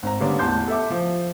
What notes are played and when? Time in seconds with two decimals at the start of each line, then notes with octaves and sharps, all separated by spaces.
0.03 G#1 A#5
0.20 D3 G3 A#3 B3 C#4 D4
0.39 A1 E2 A5 C6 G6
0.68 A4 E5 D6
0.90 F3